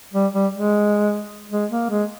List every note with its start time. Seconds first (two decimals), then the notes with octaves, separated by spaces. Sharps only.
0.14 G3
0.33 G3
0.52 G#3
1.52 G#3
1.71 A#3
1.90 G#3